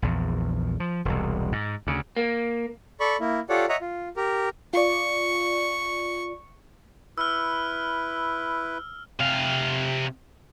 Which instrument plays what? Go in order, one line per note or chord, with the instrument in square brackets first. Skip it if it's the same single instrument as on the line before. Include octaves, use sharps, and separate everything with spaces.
[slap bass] A#1 E2
F3
E1 C2
G#2
D2 C#3
[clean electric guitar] A#3
[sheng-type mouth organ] A4 D5 B5 C#6
A#3 E4
F4 G4 A4 C#5 D5 F#5
C#5 D#5 E5 F#5 A#5
F4
G4 A#4
[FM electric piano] F4 D5 [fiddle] C#6
[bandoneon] E4 B4 [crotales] E6 F6
[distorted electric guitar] C3 F5